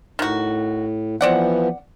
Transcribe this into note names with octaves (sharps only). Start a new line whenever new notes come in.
A2 D#3 F#4
E3 F3 B3 C4 D5 F#5